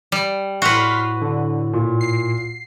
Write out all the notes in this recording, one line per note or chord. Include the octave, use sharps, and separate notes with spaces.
G3
A2 F#4 B4 C6 F6 B6
D3
A#2
C7